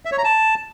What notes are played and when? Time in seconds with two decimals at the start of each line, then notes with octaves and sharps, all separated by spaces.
0.05 E5
0.12 C#5
0.18 A#5
0.24 A5